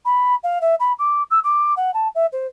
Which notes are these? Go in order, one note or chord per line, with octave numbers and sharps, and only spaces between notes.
B5
F5
E5
B5
D6
E6
D6
F#5
A5
E5
C5